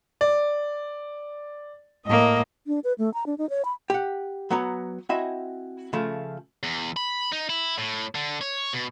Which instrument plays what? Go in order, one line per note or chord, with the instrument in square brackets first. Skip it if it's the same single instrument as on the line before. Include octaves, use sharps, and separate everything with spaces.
[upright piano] D5
[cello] A2 A#3 [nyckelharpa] D#5
[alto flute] D4
B4
A3
A#5
D4
D#4
C#5
B5
[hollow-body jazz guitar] G4 F#5
F#3 B3 C#5 A#5
C4 E4 F#4 D#5 E5 G#5
C#3 F3 A3
[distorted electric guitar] E2
B5
D#4
E4
A2
D3
C#5
B2